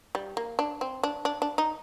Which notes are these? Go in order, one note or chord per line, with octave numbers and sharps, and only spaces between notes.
G3
A#3
D4
C4
D4
D4
D4
D#4